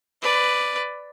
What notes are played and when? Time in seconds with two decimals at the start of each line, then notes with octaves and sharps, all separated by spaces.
0.22 B4 D5